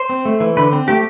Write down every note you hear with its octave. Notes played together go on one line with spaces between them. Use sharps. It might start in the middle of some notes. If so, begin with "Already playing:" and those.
Already playing: C5
C4
A3
E3
D3 B4
C4
A3 G4